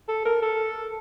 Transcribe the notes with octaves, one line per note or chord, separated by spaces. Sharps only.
A4
A#4
A4